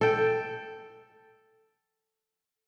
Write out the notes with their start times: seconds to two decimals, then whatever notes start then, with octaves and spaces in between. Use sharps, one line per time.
0.01 A4 G5